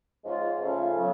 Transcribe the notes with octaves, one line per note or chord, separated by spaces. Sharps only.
G#2 F3 G#3 C#4 F4
C#3 F3 A3 C#4 F4
C#3 F#3 B3